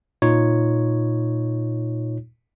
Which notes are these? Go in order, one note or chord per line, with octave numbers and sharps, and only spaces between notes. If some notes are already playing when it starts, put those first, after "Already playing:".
A#2 D#4 F4 C#5